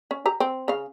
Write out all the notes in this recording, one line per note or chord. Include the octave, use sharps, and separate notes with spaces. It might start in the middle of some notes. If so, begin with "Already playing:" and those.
C#4
G4 A#5
C4
C#3 F5